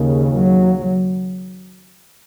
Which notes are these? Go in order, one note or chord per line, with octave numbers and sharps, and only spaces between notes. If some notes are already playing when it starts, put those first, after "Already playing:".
Already playing: D#2 C#3
F#3